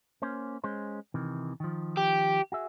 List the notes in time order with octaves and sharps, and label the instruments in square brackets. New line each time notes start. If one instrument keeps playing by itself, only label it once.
[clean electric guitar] A#3 C#4 C5
G#3 C#4 C5
C3 D#3 E3
D#3 F3
[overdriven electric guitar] G4
[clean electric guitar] F#4 G#4 E5